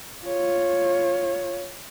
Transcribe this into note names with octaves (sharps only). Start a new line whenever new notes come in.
F4 C#5